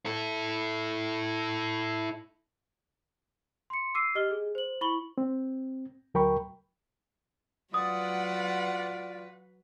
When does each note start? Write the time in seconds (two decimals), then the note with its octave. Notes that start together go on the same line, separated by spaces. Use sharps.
0.06 E4 A4
3.70 C6 C#7
3.95 D6 E6 C7 D#7
4.15 G4 D#5 F6 G7
4.31 G#4
4.55 C5 F#7
4.81 E4 B5 C#6 F#7 G7
5.18 C4
6.14 D2 F#3 A#4 G5 B5 C#6
7.74 F#3 F4 B4 D5 F#5 D#6